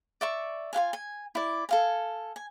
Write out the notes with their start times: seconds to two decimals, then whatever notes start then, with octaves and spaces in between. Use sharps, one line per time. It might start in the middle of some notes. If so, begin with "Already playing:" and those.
0.21 D5 E5 C#6
0.73 F4 G#4 F5 G#5
0.93 G#5
1.35 E4 D5
1.69 A4 F5 G#5
2.36 G#5